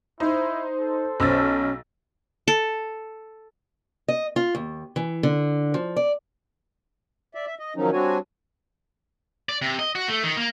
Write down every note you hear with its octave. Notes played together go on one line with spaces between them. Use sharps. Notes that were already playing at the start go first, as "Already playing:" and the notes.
D#4 E4 C5
A4
B1 C#4 E6 A6
A4
D#5
F4
D#2
E3
D3
F3
D5
D5 E5
E5
D#5
D#3 F3 F#3 C#4 D#4
G3 C4 D4 F#4 C#5 G#5
D5
C3
D#5
F#4
A3
D#3
A#3